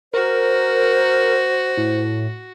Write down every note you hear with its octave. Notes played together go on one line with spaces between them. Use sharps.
F#4 A#4 C5
A2